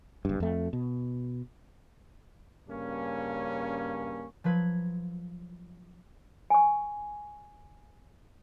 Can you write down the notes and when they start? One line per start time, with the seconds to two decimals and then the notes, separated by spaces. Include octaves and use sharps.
0.25 F#1 G2
0.40 F2 A3
0.73 B2
2.68 G2 C#3 A#3 C#4
4.44 F3 F#3 B4 G#6
6.50 G#5 C#6